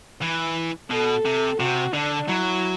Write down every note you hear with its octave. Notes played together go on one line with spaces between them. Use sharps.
E3
B2 A4
C3
C3 F#4
D3 D4
F#3 E4